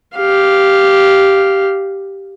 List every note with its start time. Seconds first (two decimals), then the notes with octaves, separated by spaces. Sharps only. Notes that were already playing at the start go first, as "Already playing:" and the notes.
0.15 G4 F5